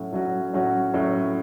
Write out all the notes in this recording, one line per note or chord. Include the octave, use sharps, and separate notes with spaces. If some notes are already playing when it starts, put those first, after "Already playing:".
Already playing: A2 F#3 C#4 F#4
A2 F#3 C#4 F#4
A2 F#3 C#4 F#4
A2 F#3 C#4 F#4